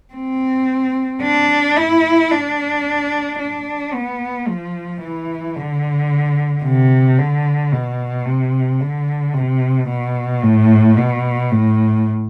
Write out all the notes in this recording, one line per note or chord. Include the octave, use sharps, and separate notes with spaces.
C4
D4
E4
D4
D4
B3
F3
E3
D3
C3
D3
B2
C3
D3
C3
B2
A2
B2
A2